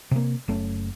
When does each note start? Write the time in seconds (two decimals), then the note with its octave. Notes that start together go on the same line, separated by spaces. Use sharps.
0.11 C3 A#3
0.48 F#1 A3 C#4